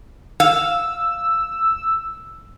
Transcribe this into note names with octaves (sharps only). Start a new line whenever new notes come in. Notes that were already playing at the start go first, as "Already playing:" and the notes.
F5 E6